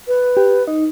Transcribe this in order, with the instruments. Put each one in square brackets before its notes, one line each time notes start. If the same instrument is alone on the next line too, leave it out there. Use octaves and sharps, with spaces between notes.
[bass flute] B4
[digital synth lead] G4
D#4